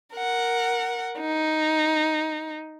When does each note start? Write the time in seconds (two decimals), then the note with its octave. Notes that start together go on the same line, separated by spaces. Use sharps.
0.16 A#4 F#5
1.20 D#4